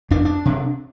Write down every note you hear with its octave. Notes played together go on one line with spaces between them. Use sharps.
F2 D4
D4
C3